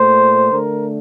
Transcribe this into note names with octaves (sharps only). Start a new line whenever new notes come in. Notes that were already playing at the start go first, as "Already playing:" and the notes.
Already playing: A#2 A3 C5
D3 A3 A#4